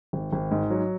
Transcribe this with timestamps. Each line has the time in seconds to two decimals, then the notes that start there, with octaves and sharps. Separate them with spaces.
0.13 G#1
0.33 G#1
0.51 G#2
0.70 F#3